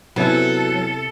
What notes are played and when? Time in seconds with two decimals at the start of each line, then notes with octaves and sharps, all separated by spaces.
0.16 C3 F#3 B3 C#4 E4 A4